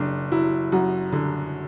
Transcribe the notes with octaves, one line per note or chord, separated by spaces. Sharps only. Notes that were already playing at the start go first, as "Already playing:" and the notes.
Already playing: F#1 D4
F#3 E4
F#2 F#4
D3